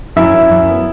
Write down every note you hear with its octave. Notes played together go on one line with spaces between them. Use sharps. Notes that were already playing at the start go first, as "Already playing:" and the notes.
F#2 E4 E5
F#2
F#2
B3